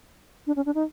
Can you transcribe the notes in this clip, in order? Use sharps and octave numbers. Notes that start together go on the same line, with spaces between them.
D4
C#4
D4
D#4